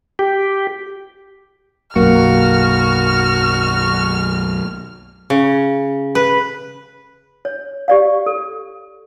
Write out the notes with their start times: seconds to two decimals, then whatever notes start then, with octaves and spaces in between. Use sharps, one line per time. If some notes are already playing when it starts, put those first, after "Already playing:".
0.19 G4
1.96 B1 F#2 A#3 F#4 F6
5.30 C#3
6.15 B4
7.45 C#5
7.88 G4 D5 F5
8.26 A4